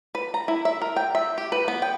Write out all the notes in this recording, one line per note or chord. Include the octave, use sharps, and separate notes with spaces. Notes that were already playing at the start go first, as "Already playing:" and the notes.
B4
A#5
E4
E5
A#4
G5
E5
G4
B4
B3
G5